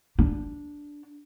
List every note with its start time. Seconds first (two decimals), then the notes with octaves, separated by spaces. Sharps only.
0.19 D4